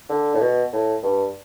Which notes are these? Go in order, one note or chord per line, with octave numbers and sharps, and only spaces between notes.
D3
A2
B2
A2
G2